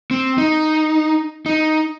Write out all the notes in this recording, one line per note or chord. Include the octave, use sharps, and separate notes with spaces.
C4
D#4
D#4